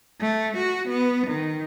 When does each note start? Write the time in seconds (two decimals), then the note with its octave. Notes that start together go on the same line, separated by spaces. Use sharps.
0.21 A3
0.57 F#4
0.89 B3
1.28 D#3